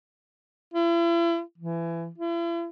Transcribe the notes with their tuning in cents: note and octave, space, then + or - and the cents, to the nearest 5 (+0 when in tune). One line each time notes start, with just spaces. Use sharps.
E4 +40
E3 +25
E4 +45